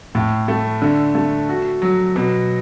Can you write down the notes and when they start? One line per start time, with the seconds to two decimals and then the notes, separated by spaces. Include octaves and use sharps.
0.15 A2
0.48 A3
0.82 D3
1.15 A3
1.49 F#4
1.82 F#3
2.16 B2